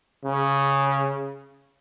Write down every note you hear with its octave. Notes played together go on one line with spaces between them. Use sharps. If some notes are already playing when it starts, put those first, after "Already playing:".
C#3